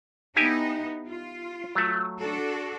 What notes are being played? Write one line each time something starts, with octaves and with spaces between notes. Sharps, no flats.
B3 D#4 E4 G4 G#5
F4
F#3 A3
D4 F#4 A4